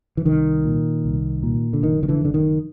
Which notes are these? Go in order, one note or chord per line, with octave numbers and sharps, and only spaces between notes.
E3
C2 D#3
A#2
C2
A#2
D3
F#1 D#3
D#3
D3 E3
F#1 D3
D#3